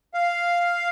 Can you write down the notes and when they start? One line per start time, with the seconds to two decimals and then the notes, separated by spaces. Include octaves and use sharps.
0.14 F5